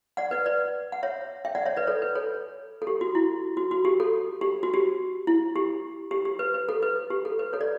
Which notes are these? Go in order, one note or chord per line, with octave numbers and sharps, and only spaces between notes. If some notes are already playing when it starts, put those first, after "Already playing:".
D5 F#5
B4 D5
B4 D5
F#5
C#5 E5
E5 G5
D5 F#5
C#5 E5
B4 D5
A4 C#5
B4
A4 C#5
A4
G4
F#4
E4
F#4
F#4
G4
A4
G4
F#4
G4
E4
G4
G4
G4
B4
B4
A4
B4
G4
A4
B4
A4 C#5
D5